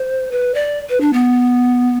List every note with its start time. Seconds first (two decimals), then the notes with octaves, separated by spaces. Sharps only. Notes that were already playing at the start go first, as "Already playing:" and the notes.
Already playing: C5
0.32 B4
0.55 D5
0.90 B4
1.01 D4
1.13 B3